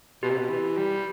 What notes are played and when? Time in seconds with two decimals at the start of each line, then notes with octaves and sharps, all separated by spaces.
0.23 B2 G4
0.30 C3
0.38 B2
0.49 E3
0.77 G3